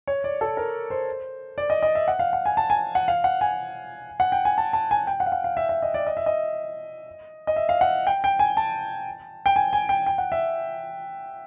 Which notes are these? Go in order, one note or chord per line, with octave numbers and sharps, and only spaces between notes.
C#5
D5
A4
A#4
C5
D5
D#5
D#5
E5
F#5
F5
F#5
G#5
A5
G#5
F#5
F5
F#5
G#5
F#5
G5
G#5
A5
A5
G#5
G5
F#5
F5
F#5
F5
E5
E5
D#5
D5
D#5
E5
D#5
D#5
E5
F5
F#5
G5
G5
G#5
A5
G5
G#5
G#5
G5
G5
F#5
E5